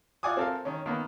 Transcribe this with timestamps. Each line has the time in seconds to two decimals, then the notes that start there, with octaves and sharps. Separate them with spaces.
0.23 F4 D5 F#5 G#5 D6 D#6
0.37 C4 A4 A#4 F5
0.65 D#3 C#4
0.86 D#3 A#3 B3